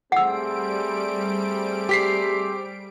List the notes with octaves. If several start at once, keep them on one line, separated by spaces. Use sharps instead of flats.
G3 A3 C4 G#4 F#5 E6 D7
G4 B6 C7